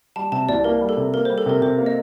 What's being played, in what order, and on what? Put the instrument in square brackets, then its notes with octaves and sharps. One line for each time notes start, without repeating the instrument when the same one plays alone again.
[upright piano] G3 [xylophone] A5
[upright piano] C3 [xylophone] A5
[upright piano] C2 [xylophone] D5
[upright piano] A#3 [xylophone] A#4
[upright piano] G3
[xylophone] A4
[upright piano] C3
[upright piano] A#3 [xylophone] A#4
[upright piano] G3 [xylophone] C5
[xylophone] A4
[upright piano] C3 [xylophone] A#4
[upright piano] C3 [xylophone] C5
[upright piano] A#3
[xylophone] D#5